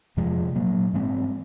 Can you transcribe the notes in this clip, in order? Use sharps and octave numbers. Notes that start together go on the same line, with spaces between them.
F2 C3 F3 G#3
A#2 F#3 A#3
G#2 E3 G#3 C4